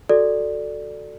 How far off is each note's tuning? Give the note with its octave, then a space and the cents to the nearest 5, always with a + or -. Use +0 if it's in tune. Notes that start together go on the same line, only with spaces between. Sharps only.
F#4 +0 A4 +0 D5 +0